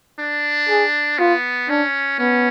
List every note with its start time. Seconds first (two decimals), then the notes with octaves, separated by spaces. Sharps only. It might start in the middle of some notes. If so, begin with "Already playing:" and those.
0.19 D4
0.69 G#4
1.19 B3 F4
1.69 C#4 D4
2.19 B3 C#4